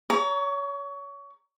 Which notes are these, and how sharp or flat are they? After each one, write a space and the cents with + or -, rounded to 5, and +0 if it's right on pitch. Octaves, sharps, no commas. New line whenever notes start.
C#5 +25 A#5 +0 D6 -45